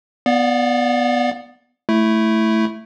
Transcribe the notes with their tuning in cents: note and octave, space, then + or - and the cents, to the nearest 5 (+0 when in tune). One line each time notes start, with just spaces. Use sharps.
B3 +0 D5 +0 F5 +40
A3 +0 E4 +0